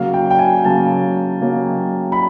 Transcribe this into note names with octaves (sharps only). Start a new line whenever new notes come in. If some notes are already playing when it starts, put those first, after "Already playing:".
Already playing: C#3 F#3 A#3 F5
G5
G5
G#5
C#3 F#3 A#3 A5
C#3 F#3 A#3
B5